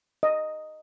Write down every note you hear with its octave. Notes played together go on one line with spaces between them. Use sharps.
D#5